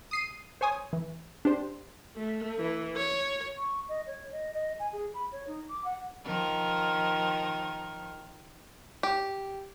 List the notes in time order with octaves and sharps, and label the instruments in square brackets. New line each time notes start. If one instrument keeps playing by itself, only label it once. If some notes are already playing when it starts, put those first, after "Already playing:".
[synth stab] D#6 C7 D#7
C5 C#5 G#5 D#6
E3
D4 G4 C5
[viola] A3
E3
C#5
[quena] C#6
D#5
C#5
D#5
D#5
G#5
G#4
B5
C#5
D#4
D6
F#5
[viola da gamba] D#3 F3 A#4
[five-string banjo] G4